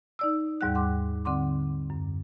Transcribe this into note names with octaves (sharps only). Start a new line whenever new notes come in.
D#4 D5 E6
D#2 G#2 G3 F#5 F#6
F#5 C6 D6
D3 C4 F#5 C6 D6
F#2